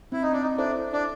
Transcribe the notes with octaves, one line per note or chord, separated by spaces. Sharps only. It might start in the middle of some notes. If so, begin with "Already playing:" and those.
C4 E4
D#4
D4
D#4
D4 E4 A4 C5 E5
D4